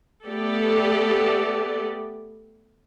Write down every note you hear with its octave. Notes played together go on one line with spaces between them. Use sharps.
A3 B3 G4 A4 D5